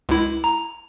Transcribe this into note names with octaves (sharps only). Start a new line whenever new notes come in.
C#2 E4
A#5